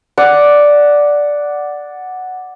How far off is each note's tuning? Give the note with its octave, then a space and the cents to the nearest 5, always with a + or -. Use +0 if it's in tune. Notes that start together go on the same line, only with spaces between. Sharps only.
D5 +0 F#5 +0